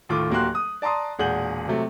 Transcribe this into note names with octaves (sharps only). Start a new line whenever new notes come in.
D#2 A2 F4 D6
D1 A#3 F#4 G4 C6 F#6
D#6
D5 A5 A#5 C6 D#6
E1 A#2 G#4 F#5 G6 F#7
C3 F#3 A3